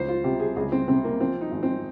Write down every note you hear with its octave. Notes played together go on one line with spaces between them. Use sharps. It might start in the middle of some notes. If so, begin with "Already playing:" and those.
Already playing: C#2 F3 C5
F4
C3 G4
G#4
C#2 G#4
C4
C3 C4
A#3
F3 C4
D#4
G#1
C4